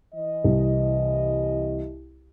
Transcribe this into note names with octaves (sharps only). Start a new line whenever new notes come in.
E3 D#5
C2